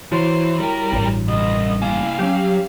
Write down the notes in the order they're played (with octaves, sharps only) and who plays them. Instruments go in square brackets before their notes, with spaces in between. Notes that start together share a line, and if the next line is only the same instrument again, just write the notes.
[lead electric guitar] E3 [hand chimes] E4 F#4 C#5 [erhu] C5
[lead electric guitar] G3 G5 [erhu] A#4
[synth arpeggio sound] A1 G2
[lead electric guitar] C2 [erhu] D#5
[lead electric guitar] A#3 E4 [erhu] F5 [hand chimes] G#5
[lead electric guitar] F#3 [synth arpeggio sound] C#4 G4